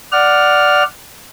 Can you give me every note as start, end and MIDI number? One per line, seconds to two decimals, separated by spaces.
0.12 0.83 74
0.12 0.83 78
0.12 0.83 89